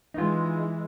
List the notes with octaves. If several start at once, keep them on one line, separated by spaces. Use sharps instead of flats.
E3 G#3 D#4 F4